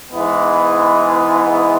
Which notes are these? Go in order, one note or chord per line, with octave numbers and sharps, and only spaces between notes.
G#2 E3 G#3 B3